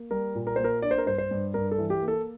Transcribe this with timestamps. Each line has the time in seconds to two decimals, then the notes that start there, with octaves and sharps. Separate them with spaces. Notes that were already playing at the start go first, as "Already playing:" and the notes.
Already playing: A#3
0.11 G3 A#4
0.35 A#2
0.47 A#4
0.56 A#3 C5
0.64 A#4
0.82 D4 D5
0.91 C5
0.98 A#4
1.06 G2 C5
1.18 C5
1.31 G2
1.54 G2 A#4
1.72 A4
1.78 E3
1.90 G4
2.02 A#3
2.08 A4